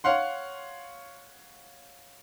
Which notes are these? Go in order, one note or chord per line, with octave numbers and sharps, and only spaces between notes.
C#5 F5 F#5 C6